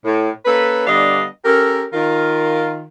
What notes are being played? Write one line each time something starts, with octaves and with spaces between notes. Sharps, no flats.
A2
A#3 C#4 A4 B4
D3 G3 B3 D4 D#5 F5
C#4 G4 A4 A#4
D#3 F4 A#4